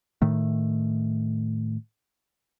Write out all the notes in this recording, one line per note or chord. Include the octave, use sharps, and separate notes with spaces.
A2 D#3 A3